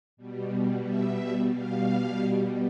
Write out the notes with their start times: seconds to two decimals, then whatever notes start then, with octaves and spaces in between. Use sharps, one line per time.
0.17 B2 G3
0.83 E5
1.50 B2 G3 F5